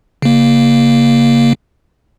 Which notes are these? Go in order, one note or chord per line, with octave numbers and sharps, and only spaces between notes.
C#3 A#3